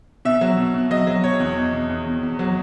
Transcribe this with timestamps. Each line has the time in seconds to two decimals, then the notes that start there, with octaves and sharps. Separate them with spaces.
0.25 B2 E5
0.41 F#3
0.58 B2
0.74 B2
0.91 F#3 D#5
1.07 F#3
1.23 B2 C#5
1.40 E2
1.57 E2
1.73 B2
1.89 E2
2.05 E2
2.23 E2
2.39 F#3